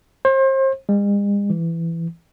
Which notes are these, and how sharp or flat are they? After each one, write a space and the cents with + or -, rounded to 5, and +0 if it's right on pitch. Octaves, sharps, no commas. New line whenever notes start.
C5 +35
G#3 -45
E3 +15